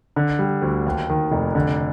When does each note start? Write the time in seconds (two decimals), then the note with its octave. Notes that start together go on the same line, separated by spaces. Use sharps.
0.16 D3
0.39 G3
0.62 D2
0.86 D#2
1.09 D#3
1.32 F1
1.55 D3